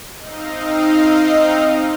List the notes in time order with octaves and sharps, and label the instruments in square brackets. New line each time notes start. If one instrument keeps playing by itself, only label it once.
[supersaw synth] C4 D#4 D#5 F5